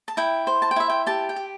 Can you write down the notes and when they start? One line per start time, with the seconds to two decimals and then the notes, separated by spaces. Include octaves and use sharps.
0.08 A5
0.17 E4 G5
0.47 C5
0.62 A5
0.71 G5
0.76 E4 E5
0.89 G5
1.07 G4 A5
1.29 G5
1.36 G4